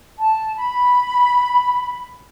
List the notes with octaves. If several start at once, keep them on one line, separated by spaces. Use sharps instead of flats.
A5
B5